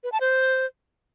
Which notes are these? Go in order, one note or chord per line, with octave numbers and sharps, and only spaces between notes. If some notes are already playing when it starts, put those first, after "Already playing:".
B4
A5
C5